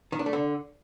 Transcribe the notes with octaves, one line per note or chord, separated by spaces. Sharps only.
D#3
D4
A3
D3